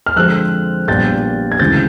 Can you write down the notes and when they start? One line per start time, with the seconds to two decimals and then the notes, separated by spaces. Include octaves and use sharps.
0.06 F6
0.16 F2 D3 F3 G#3 C4 E6 F#6
0.88 A#1 A#2 G3 B3 G6 A6
1.52 G#6
1.59 D2 C#3 E3 G#3 C4 G6 A6